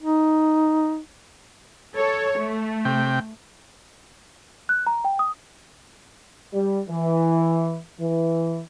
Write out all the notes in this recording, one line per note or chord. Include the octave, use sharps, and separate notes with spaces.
D#4
A4 C#5
A3
C3 G5
F#6
A#5
G5
D#6
G3
E3
E3